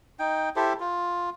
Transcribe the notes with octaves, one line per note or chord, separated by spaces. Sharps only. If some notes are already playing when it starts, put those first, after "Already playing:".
D#4 G5
E4 G4 A4 C5
F4